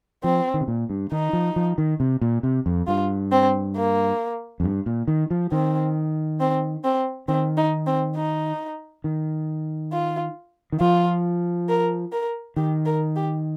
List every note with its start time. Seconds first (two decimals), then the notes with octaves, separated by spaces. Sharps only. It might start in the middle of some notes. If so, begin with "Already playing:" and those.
0.24 F3 C4
0.54 D#3
0.61 C3
0.68 A#2
0.90 G2
1.12 D#3 D#4
1.33 F3
1.56 F3
1.78 D#3
2.00 C3
2.21 A#2
2.43 C3
2.66 F2
2.87 G2 F4
3.32 C4
3.76 A#3
4.60 F2
4.63 G2
4.86 A#2
5.08 D#3
5.31 F3
5.52 D#3 C4
6.40 C4
6.84 C4
7.28 D#3 C4
7.57 D#4
7.87 C4
8.16 D#4
9.04 D#3
9.92 F4
10.72 D#3
10.80 F3 F4
11.69 A#4
12.12 A#4
12.57 D#3 G4
12.86 A#4
13.16 G4